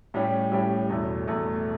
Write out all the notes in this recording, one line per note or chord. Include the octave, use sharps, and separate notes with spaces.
A2 G3 C#4 G4
A2 G3 C#4 G4
E2 B2 A3
E2 B2 A3